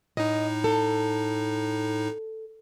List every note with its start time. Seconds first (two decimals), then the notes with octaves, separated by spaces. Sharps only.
0.17 A2 D#4 D#5
0.64 A4